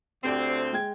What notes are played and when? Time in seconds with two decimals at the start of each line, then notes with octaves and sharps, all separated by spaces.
0.24 D2 C4 G4 D5 G5
0.73 G#3 G5 G#6